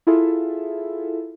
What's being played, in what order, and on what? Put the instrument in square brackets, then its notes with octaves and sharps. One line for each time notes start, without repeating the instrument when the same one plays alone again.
[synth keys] E4 F4 G#4 A4 E5